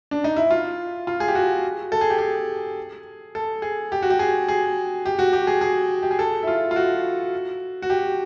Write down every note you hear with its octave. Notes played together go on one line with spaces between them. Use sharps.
D4
D#4
E4
F4
F4
G#4
G4
F#4
A4
G#4
G4
G#4
A4
G#4
G4
F#4
G4
G#4
G#4
G4
F#4
G4
G#4
G#4
G4
G#4
A4
E4
F4
F4
F#4
F#4
G4